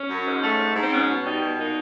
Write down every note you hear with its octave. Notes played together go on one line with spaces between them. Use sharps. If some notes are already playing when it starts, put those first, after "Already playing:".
Already playing: C#4
F#2
G#2
A3
G#2
G#2
C4
B2 C#4
B2
G3 D#4
B2
A#2 D#4